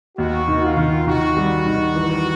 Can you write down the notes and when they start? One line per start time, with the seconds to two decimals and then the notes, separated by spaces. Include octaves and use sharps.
0.18 D#2 F#4
0.48 D#3
0.63 F4
0.77 D#3
1.07 D#3 F#4
1.37 G3
1.66 D#3
1.96 E3